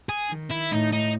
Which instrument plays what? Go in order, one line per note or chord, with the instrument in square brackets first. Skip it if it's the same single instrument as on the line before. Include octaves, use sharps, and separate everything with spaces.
[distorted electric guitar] G#4
[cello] D#3
[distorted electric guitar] E4
[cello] A2 [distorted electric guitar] D#4
[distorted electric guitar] D#4